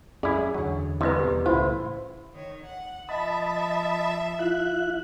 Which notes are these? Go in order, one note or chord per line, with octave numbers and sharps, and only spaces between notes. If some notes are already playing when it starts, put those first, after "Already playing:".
F#2 C#4 E4 G#4 D5
E2 D3 F#3
C2 C3 E4 B4 D#5
E2 B2 G4
C#2 A2 C#3 E4 F4 C5
D#3 C#5
F#5
F3 D#5 E5 A5 B5
E4 F4 F#6